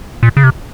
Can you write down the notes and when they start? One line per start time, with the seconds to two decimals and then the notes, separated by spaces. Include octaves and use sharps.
0.23 A#2
0.37 C#3
0.44 C3